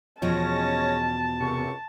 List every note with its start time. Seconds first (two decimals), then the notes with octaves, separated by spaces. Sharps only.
0.22 E2 B2 F3 G#3 C#4 C#5 A5 A#6
1.41 C#2 F#2 C3 C#6